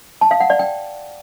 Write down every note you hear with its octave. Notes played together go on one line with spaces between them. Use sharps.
A5
F5
F#5
D5
G5